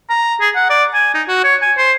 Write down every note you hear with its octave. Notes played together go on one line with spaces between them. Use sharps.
A#5
G#4
F#5
D5
G#5
D#4
F#4
C#5
G#5
C5